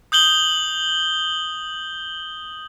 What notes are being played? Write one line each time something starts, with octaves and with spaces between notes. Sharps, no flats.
D#6 G6 F#7 G7